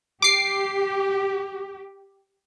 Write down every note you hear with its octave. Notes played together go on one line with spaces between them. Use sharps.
G4 D6 C7